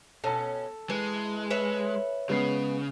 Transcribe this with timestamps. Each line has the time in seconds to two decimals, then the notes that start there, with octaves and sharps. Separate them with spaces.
0.24 B2 C#4 A4 A5
0.90 E3 G#3
1.50 B4 C#5 E5
2.29 C#3 G#3 B3 C7